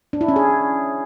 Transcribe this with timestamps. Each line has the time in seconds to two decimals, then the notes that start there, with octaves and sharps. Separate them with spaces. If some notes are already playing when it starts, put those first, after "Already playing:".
0.13 D4
0.21 E4
0.28 C#4
0.36 G#4